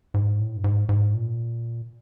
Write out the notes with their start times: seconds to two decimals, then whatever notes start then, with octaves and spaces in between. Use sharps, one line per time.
0.14 G#2
0.39 A2
0.56 G2
0.64 G#2
0.89 G#2
1.14 A#2